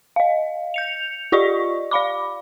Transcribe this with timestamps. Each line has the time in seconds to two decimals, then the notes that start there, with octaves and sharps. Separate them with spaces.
0.16 D#5 F5
0.74 G6 C#7 F7
1.32 F4 G4 D5 D#5 C#6
1.91 D5 F5 B5 D6